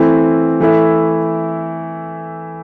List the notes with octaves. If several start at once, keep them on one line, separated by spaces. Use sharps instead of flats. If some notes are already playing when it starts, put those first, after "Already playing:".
Already playing: E3 A3 C4 E4
E3 A3 E4